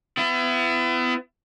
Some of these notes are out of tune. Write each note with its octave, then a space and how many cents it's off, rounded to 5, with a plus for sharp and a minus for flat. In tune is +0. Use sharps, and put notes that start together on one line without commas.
B3 +35 E4 +35